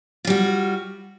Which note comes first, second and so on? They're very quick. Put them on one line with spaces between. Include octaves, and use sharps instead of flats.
F4 G3 F#4